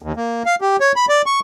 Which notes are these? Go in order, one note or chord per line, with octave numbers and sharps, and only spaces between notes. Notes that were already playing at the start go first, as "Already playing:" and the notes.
D#2
A#3
F5
G4
C#5
B5
D5
C#6